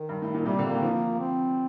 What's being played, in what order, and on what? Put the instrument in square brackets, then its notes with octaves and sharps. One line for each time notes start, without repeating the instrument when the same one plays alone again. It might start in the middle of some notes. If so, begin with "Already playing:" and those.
Already playing: [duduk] D#3
[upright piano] G2
A2
A#2
[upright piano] C3 [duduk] G3
[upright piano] D3
[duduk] A#3
[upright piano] D#3
F3
[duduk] C4